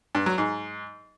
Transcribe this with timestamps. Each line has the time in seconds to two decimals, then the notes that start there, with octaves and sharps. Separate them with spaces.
0.15 G2
0.26 F#3
0.38 G#2